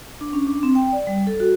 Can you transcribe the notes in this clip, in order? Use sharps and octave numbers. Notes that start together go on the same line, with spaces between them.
D4
C#4
D4
C4
G5
D5
G3
A4
F#4